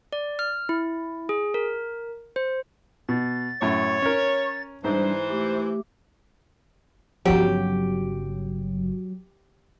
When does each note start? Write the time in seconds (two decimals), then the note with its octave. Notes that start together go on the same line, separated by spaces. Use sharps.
0.13 D5
0.39 F6
0.69 E4
1.29 G#4
1.54 A#4
2.36 C5
3.09 B2 A6
3.62 F#2 A2 C#5
4.02 C#4 A#4
4.84 G#2 E3 G3 D4 C5
5.30 A3 G4
7.25 G1 C#3 F3 F#3 G4